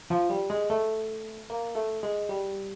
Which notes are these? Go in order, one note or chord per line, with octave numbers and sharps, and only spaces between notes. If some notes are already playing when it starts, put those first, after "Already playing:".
F3
G3
G#3
A3
A#3
A3
G#3
G3